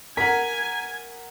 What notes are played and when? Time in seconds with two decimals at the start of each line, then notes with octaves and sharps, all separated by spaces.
0.17 A#4 F#5 G#5 A#5 B6